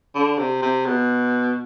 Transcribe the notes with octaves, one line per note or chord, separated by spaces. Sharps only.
D3
C3
C3
B2